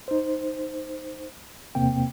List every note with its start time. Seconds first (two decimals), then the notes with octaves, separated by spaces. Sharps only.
0.08 D#4 C5
1.75 E2 C3 A#3 C4 G5